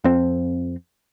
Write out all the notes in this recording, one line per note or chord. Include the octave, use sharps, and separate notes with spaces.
F2 C4